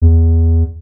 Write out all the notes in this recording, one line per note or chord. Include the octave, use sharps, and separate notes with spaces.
E2